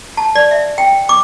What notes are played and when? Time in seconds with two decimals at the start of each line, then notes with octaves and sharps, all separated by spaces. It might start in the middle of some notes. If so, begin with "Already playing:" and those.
0.17 A5
0.35 D5
0.51 E5
0.78 G5
1.09 D6